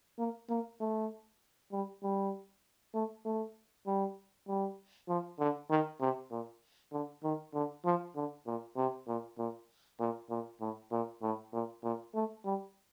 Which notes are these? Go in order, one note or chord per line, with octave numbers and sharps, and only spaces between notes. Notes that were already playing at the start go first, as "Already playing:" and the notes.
A#3
A#3
A3
G3
G3
A3
A3
G3
G3
F3
D3
D#3
C3
A#2
D3
D#3
D3
F3
D3
A#2
C3
A#2
A#2
A#2
A#2
A2
A#2
A2
A#2
A#2
A3
G3